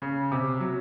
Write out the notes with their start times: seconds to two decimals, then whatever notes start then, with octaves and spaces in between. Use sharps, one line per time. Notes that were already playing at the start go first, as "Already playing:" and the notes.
0.02 C#3
0.32 C3
0.60 F#3